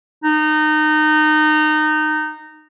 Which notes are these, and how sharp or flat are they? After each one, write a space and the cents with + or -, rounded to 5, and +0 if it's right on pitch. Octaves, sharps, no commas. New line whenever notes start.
D#4 -20